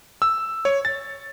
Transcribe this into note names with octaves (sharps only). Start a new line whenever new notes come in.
E6
C#5
A6